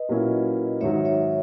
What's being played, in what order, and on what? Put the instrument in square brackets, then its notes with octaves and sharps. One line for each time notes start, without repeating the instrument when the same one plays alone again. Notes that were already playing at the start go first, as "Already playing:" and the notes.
Already playing: [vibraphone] B4 D#5
[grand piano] A#2 F#3 A#3 C#4 E4
[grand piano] G#2 D#3 F#3 [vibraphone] C#5 E5
[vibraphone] C#5 E5